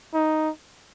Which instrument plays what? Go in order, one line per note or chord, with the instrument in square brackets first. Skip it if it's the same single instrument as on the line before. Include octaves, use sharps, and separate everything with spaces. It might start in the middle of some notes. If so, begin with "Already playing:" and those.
[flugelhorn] D#4